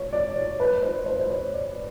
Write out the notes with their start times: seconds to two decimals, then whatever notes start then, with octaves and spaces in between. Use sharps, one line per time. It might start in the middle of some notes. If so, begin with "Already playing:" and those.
Already playing: C#5
0.13 D5
0.36 C#5
0.60 B4
0.83 C5
1.06 C5
1.19 C5
1.30 C#5
1.53 D5